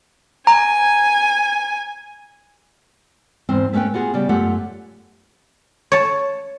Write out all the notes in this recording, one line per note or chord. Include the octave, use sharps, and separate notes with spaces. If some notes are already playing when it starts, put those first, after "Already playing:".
G#5 A#5
E2 G#2 C4
A3 C#4 B4 C#5 G5
B3 F4 F#4 G#4
C#3 G3 D5
F#2 A3 F4 G4 C#5 F#5
C#5 A5